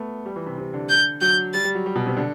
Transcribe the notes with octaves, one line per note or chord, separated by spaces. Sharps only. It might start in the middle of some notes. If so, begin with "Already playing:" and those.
Already playing: A3 B3
G3
E3
C3
C3
D3
G6
F#3 G6
G3 A6
G3
F#3
G3
B2
C3
D3